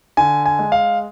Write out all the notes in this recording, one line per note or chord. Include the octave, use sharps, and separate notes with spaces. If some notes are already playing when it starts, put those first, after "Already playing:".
D3 G#5
G#5
G#3
F5